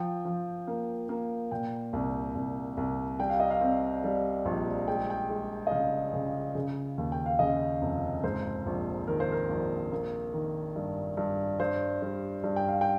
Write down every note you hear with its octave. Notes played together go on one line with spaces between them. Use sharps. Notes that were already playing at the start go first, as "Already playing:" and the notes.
Already playing: F3 G5
F3
A#3
A#3
A#2 G5
C2
C2
C2
G3 G5
F5
D#5
F5
C4
G3
A#1
G#3 G5
G5
G#3
D#5
C#3 F5
C#3
C#3
D#2
G5
F5
C#3 D#5
F1
G#2 C5
A#1
D#3 A#4
C5
A#4
A#1
A#3
D#3
G2
G2
G2 C5
G3
G2
G5
F5
G5